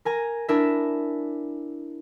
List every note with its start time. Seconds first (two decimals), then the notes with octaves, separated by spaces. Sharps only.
0.05 A#4 G#5 A#5
0.49 D4 E4 A#4 E5